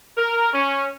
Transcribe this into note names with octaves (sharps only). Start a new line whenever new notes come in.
A#4
C#4